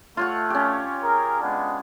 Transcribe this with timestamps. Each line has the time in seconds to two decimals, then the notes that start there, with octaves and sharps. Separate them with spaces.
0.17 A3 F4 C#5 F#5
0.50 C#4 G4
1.02 G#4 A#4
1.41 G#3 B3 D4